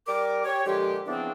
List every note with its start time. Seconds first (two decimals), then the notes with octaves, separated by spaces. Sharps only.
0.07 G3 A#4 D6
0.45 G4 C#5
0.66 A#2 D3 F3 G#3 G4
1.07 C#3 E3 F3 B3 C4 D4